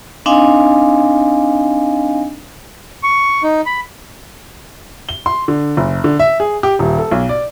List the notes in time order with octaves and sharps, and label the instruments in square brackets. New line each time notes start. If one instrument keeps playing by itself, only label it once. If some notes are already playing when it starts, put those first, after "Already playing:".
[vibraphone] C4 D4 D#4 D#5 F5 G#5
[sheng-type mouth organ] C#6
D#4
B5
[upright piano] G7
C6
D3
F#1
D3
E5
G#4
G4
D#1
A4
B1
D5